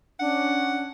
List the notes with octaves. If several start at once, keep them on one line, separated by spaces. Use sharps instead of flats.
C#4 D4 F#5